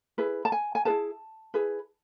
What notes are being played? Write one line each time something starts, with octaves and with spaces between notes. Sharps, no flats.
E4 G#4 B4
A5
G#5
G#5
E4 G#4 B4 A5
E4 G#4 B4